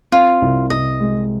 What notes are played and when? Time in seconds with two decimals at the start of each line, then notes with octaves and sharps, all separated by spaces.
0.12 C4 F4
0.42 C2
0.70 C2 D#5
1.00 G#3